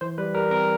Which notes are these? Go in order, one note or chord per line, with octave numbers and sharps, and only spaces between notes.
E3 C5
G3 B4
G3 A#4
C4 A#4